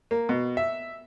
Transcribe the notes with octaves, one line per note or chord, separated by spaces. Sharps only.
A#3
B2
E5